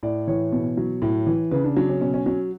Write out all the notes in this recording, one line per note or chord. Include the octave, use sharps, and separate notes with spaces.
A2 D5
E3 C#5
B2
F#3
A2
E3
C#3 B4
D4
F#3 D4
C#4
B2 C#4
C#4
F#3 C#4